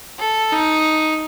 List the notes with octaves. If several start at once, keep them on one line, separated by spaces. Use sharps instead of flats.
A4
D#4